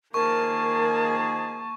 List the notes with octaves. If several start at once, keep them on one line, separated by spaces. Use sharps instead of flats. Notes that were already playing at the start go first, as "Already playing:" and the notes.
D#3 F3 A#3 G#4 A#4 A5 C#6